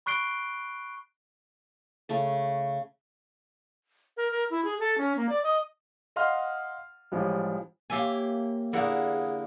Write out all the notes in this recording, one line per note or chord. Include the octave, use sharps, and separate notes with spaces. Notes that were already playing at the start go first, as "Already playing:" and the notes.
B5 C#6 F#6 C7 D7 G7
C#3 A3 C#4
A#4
A#4
E4
G#4
A4
C#4
A#3
D5
D#5
D#5 F5 F#5 C6 F6
A1 F3 G3 G#3
A#3 C#4 F4 G4 E5 G#5
E2 D3 A#3 E4 G#4 F#5